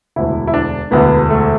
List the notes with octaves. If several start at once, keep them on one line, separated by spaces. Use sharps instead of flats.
E1 D2 D3 E4
E4
D4
E1 D2 D3 B3
A3